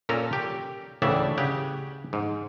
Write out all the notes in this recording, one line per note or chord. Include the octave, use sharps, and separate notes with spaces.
A#2 C#4 A4 A#4 A#5
G4
D2 A2 C#3 E3 D5 E5
C#3 G4 C#5 F#5
G#2